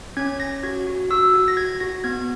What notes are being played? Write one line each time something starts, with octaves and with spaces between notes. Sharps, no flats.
C#4 G#6
C#4 A#6
F#4 G#6
F#4
F#4 E6
F#4
A#6
F#4 G#6
F#4 A#6
B3 G#6